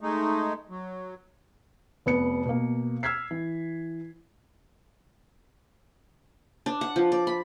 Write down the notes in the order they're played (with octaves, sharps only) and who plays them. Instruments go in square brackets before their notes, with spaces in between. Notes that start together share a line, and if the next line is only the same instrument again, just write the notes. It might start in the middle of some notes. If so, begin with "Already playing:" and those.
[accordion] G#3 A3 D#4
F#3
[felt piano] F1 B3 C#7
B2 A#3
E6 F6 G#6 B6 C7
E3
[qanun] D4
F#5
F3
D5
B5